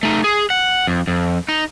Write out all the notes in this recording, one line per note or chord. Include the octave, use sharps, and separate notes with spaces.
A3 D#4
G#4
F#5
F2
F2
D#4